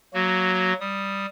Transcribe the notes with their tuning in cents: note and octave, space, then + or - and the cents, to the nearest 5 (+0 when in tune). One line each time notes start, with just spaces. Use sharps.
F#3 +5 A#3 +0 F#4 +0
G3 +0 D#6 +0